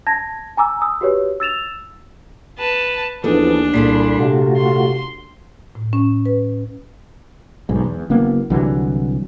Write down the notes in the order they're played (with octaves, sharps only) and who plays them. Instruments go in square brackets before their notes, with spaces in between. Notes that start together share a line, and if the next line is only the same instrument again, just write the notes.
[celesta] A5 G#6 A#6
G#5 A#5 D6 E6
D#6 E6
F#4 G4 B4 C#5
E6 A6 E7 F7
[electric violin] B4 A5
[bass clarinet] D#2 [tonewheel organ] E3 F3 B3 [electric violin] D4 [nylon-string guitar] D#4 G#4 A4
[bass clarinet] C2 [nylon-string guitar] A#2 G#4 A4 [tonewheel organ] B5 C6
[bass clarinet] C3 [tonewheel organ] A3 F4 F#4
[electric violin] C6
[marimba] A2
C#4
B4
[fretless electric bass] B1 G#2
E2
F#1 A#3 B3
C2 D3 E3 F#3